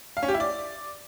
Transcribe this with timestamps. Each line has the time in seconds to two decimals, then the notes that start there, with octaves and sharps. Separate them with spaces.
0.17 F5
0.23 C#4
0.28 G4
0.34 E4
0.40 D5